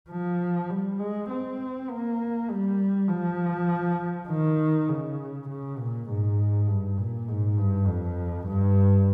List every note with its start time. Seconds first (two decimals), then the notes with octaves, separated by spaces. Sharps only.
0.10 F3
0.70 G3
0.99 G#3
1.30 C4
1.90 A#3
2.50 G3
3.08 F3
4.28 D#3
4.88 C#3
5.49 C#3
5.78 A#2
6.08 G#2
6.67 G2
6.97 A#2
7.28 G#2
7.58 G2
7.87 F2
8.47 G2